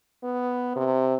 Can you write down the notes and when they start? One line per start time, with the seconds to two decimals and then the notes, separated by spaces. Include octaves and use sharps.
0.24 B3
0.76 C3